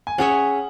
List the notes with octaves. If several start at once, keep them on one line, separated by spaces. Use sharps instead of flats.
G#5
C#4 G#4 C#5 E5 F#5